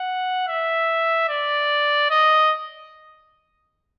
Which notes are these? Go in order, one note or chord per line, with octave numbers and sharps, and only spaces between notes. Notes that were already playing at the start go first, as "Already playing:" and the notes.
Already playing: F#5
E5
D5
D#5